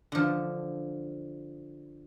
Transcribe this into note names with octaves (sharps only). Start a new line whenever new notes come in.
D3 F3